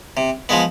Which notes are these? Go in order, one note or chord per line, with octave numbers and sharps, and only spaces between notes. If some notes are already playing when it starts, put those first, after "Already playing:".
C3
F3 G#3 B3